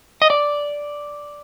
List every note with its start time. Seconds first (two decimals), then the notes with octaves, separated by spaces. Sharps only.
0.22 D#5
0.30 D5